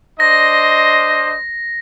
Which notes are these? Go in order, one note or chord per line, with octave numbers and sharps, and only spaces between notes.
D4 C5 D#5 A#6